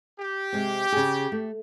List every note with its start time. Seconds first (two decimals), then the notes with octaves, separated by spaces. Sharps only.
0.19 G4
0.52 C3 G#3 C4
0.92 C#3 G#4
1.32 A3